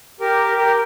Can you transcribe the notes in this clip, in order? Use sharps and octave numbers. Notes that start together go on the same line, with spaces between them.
G4 A#4
G4 A#4